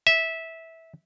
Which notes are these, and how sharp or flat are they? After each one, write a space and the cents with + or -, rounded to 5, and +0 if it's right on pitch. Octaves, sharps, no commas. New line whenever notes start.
E5 -15